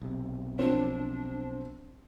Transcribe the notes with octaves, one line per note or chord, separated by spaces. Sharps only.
B1 C3
F3 C4 D4